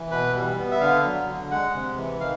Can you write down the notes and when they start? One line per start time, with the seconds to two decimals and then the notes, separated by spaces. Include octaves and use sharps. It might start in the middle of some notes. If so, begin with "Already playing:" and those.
Already playing: E3
0.11 B2 B4
0.35 G3
0.58 B3
0.71 E5
0.81 D3 F5
1.04 F#3
1.28 D3
1.51 G#3 F#5
1.74 C3
1.97 E3
2.20 D#3 F5